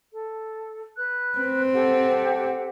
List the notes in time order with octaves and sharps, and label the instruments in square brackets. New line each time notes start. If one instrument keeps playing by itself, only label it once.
[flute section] A4
B4 F#6
[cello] C4
[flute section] G4 A4 F#5